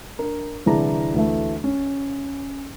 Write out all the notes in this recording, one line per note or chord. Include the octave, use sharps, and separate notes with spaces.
D4 A#4
C2 D3 E3 D4 G#4 A#5
D2 E3 A3
C#4